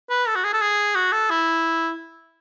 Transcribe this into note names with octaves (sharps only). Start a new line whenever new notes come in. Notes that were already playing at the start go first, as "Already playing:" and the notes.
B4
A4
F#4
G#4
A4
G#4
F#4
A4
E4